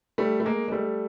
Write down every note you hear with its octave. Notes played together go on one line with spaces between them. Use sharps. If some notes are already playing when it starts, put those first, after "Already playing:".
G3 A3
A3
G#3 A#3
G#3
G3 A3